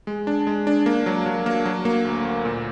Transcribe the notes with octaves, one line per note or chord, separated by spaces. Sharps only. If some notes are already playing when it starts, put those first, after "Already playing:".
G#3
D4
G#3
D4
A#3
F#3
F#3
A#3
F#3
A#3
D2
D2
A#2